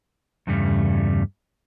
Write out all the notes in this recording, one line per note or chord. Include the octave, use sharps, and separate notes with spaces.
E2 G2 C#3 G3 A3